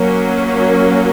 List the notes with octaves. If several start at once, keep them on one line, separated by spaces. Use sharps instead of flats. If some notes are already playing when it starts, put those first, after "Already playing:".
Already playing: F#3 A#3 C#4